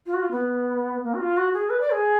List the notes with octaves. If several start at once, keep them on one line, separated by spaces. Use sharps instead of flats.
F4
F#4
F4
B3
A#3
F#4
F4
F#4
G#4
B4
D5
G#4